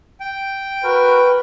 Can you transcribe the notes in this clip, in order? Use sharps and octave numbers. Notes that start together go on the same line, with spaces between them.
G5
F#4 A#4 B4